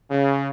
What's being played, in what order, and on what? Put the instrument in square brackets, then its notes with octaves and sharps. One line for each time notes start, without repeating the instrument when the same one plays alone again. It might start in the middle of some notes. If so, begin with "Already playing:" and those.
[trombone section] C#3